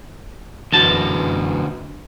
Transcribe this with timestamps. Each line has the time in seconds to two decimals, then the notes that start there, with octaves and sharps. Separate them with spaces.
0.73 F#2 D3 E3 F#4 B4 A5